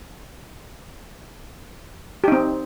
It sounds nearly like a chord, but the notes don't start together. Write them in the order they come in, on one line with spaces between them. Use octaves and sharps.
G4 D#4 C4